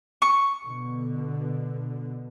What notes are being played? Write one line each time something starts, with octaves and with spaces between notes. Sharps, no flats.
C#6
B2 D3